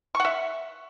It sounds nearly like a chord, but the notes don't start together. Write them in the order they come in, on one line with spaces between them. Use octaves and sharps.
C#6 F#5 E5